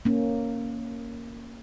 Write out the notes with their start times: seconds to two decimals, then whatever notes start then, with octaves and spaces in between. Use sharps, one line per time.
0.05 A#3 C#4